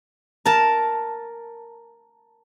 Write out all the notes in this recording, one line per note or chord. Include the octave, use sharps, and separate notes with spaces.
A#4 A5